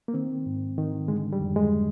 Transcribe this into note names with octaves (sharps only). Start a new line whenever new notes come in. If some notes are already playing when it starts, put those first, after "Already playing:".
A#3
D#3 C4
G#2
D#3
D3 G#3
G3
F2
G#3